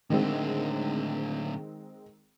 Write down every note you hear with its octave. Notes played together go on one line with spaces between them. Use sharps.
A2 D3 D#3 G#3 C4